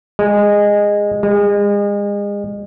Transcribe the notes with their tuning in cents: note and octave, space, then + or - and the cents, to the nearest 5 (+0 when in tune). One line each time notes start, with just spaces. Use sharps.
G#3 -15
G#3 -35